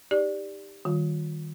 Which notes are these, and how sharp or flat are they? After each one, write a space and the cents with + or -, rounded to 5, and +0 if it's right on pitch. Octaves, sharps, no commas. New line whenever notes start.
D#4 +0 G4 +15 D5 +0
D#3 +0 G3 +0 F4 +35